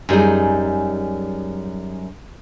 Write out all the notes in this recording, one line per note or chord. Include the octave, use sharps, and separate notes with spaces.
F#2 G3 D#4 G#4